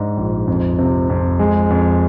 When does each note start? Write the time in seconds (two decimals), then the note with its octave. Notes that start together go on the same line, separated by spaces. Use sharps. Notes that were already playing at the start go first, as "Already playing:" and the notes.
Already playing: G#2 D4
0.17 A#1
0.47 F2
0.79 C3
1.10 F2
1.39 G#3
1.70 F2